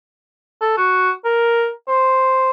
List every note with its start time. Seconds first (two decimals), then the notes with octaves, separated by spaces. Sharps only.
0.61 A4
0.78 F#4
1.25 A#4
1.88 C5